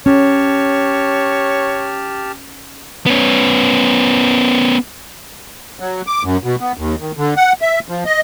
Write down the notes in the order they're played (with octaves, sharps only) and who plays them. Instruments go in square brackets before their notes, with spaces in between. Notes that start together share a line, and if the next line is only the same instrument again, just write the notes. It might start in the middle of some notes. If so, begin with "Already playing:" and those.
[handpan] C#4 [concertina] G4 A5 F6 [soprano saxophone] C#5
[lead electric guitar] B3 C#4
[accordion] F#3
D6
F#2
B2
B3
D#2
D#3
D3
F#5
E5
F3
D#5